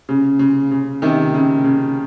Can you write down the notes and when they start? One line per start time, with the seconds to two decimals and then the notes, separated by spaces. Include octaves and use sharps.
0.09 C#3
0.39 C#3
0.71 C#3
1.02 C3 D#3
1.34 C#3
1.64 C#3